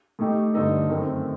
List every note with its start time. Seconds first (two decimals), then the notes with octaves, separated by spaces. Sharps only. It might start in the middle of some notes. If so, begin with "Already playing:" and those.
0.19 A2 A3 D#4 G4
0.54 G2 D3 A3 D#4 A4
0.89 F#2 D#3 A3 C4